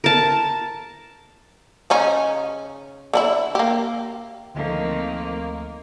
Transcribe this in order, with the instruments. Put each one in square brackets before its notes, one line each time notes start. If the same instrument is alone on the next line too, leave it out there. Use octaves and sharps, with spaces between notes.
[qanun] A#4 A5
[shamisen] C#3 C#4 D#4
D3 D4 E4
A#3 G4
[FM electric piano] D2 A3 [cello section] D#3 F3 C4 [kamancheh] A#3 D#4